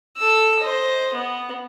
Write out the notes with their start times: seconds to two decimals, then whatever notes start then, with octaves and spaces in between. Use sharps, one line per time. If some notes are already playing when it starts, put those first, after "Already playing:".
0.17 A4 E6
0.61 C5 D#5
1.14 B3